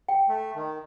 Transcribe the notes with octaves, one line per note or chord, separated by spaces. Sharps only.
G5
A3
D#3